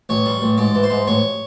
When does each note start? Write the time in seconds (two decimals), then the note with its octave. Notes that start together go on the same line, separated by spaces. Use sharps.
0.09 A1 C#5
0.26 G3
0.42 A1
0.58 G#2 D5
0.75 E3
0.83 C5
0.90 G#2
1.07 A1 C#5